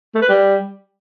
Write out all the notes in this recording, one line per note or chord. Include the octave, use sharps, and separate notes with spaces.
A3
B4
G3